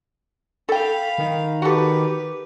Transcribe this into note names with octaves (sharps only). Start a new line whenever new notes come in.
A4 F5 G5 B5
D#3
F#4 G4 A4 B4